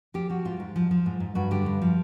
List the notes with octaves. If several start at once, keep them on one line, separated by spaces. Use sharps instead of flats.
F3 G4
F3 F#4
G#2 F4
G#2
F3
F3
G#2
G#2
G2 F#4
D3 G4
G2
F3